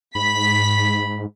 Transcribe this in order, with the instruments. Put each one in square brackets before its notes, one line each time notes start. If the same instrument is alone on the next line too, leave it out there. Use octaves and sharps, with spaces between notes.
[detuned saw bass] G#2 [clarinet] B5 [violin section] B6